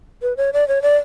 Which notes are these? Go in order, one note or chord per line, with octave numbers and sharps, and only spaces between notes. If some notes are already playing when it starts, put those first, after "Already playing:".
B4
C#5
D5
C#5
D5